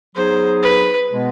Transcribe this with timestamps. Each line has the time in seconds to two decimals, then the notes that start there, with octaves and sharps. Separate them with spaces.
0.15 F#3 B3 D#4 G#4 C5
0.62 B4
1.10 B2 G#3 B3